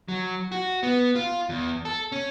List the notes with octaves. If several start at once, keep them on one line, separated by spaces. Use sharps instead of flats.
F#3
F#4
B3
F4
E2
A4
C#4